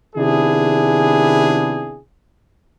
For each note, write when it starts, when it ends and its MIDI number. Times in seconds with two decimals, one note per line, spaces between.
0.16 1.99 48
0.16 1.99 51
0.16 1.99 59
0.16 1.99 62
0.16 1.99 64
0.16 1.99 68